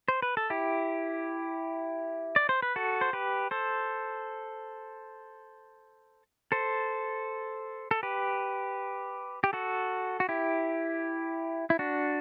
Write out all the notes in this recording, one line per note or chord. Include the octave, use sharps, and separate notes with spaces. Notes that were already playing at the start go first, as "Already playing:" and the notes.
C5
B4
A4
E4 G4
D5
C5
B4
F#4 A4
C5
G4 B4
A4 C5
A4 C5
A4
G4 B4
G4
F#4 A4
F#4
E4 G4
E4
D4 F#4